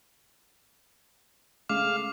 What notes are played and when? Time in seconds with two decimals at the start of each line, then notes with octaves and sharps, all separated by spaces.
1.69 C#3 G#3 A3 F5 D6